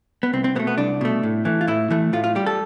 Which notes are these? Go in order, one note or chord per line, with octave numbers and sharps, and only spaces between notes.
B3
C2 C4
C4
B2 A3 B3
B3
C2 D4
B2 A3
A2
E3 A3
F4
A2 E4
E3 A3
A2 F4
F4
G3 G4
A4